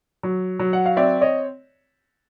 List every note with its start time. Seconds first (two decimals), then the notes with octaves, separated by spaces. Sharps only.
0.23 F#3
0.59 F#3
0.73 F#5
0.86 F5
0.96 C4 D5 E5
1.21 C#5 D#5